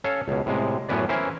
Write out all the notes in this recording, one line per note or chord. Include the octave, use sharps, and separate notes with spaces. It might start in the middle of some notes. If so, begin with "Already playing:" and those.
C#4 A4 C#5 F5
C#2 B2
A2 C3 G#3
F#2 A2 B3 C#4 B4 D5
E3 C#4 E4 A#4 C5